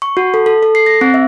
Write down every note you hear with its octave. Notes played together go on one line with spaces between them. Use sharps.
C#6
F#4
A4
A4
A4
C7
A#6
C4
E5